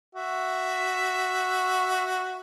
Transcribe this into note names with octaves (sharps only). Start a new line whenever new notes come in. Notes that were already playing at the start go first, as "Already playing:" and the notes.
F#4 E5